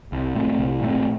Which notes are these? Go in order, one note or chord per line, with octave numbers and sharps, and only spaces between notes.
C2
A#2 A3 C4
C2
A#2 A3 C4